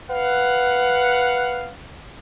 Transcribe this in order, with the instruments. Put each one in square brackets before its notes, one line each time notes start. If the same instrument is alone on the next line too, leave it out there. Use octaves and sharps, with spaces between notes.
[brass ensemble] B4 F5 F#5